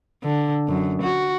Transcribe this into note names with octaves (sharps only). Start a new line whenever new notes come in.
D3
F#2
F#4